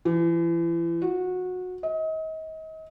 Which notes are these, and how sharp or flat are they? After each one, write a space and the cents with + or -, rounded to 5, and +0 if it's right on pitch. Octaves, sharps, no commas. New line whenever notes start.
E3 +35
F#4 -20
D#5 +35